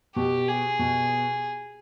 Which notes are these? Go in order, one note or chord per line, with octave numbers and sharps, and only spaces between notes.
B2 G4
G#4
B2